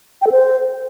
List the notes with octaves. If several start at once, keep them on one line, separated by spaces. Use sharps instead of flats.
G5
A4
C5